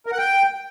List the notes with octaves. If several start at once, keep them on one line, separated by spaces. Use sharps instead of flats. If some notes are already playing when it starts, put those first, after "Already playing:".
A#4
F#5
G5